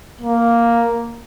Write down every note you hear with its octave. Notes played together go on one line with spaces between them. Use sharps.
A#3